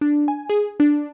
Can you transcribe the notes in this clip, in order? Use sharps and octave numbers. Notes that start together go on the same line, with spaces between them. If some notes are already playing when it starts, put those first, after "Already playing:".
D4
G#5
G#4
D4